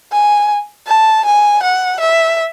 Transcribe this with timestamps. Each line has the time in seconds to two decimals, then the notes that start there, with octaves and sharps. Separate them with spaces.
0.12 G#5
0.87 A5
1.25 G#5
1.63 F#5
2.00 E5